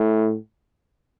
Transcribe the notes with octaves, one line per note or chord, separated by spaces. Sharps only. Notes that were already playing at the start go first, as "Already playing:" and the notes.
Already playing: A2